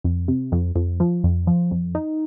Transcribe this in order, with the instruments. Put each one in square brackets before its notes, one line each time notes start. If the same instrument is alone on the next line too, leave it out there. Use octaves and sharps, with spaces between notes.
[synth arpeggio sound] F2
C3
F2
F2
F3
F2
F3
F2
D#4